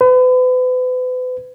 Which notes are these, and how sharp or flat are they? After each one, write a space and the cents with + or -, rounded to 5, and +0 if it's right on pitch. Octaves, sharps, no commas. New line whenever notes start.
B4 +40